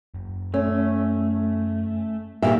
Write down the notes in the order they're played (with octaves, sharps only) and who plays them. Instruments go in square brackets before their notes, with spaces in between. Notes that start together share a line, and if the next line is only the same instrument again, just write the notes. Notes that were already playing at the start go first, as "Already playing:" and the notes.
[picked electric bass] F#1
[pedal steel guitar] A3 [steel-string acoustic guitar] C#4
[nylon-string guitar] A#2 A#3 [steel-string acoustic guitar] D#3 G4 E5